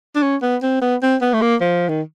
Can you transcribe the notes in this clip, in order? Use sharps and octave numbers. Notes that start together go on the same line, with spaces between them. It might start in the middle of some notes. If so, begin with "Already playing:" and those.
D4
C#4
B3
C4
B3
C4
B3
A3
A#3
F3
D#3